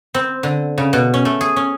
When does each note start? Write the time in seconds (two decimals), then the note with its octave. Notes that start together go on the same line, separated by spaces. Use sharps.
0.14 C4
0.43 D3
0.78 C#3
0.93 B2
1.14 C#4
1.25 A3
1.41 G#4
1.56 C#4